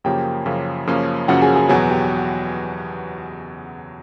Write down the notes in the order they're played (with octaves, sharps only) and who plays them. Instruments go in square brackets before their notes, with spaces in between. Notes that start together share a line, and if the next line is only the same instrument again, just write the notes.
[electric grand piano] F#2 C#3 F3 A#3 C#4 [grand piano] G4 G5
[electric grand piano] F#2 C#3 F3 A#3 C#4
F#2 C#3 F3 A#3 C#4
[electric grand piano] F#2 C#3 F3 A#3 C#4 [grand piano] F#4 F#5
[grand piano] G#4 G#5
G#4 G#5
[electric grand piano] E2 B2 F#3 B3 [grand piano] G#4 G#5
[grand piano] G4 G5